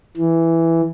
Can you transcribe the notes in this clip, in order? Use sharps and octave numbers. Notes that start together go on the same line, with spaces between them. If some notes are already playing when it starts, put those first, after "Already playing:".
E3